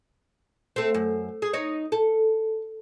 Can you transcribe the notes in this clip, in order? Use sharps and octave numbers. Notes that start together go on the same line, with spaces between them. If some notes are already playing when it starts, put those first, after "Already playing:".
A3 C4
F#2
G#4
D#4 C#5
A4